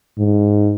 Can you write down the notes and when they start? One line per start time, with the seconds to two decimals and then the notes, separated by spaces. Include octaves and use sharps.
0.18 G#2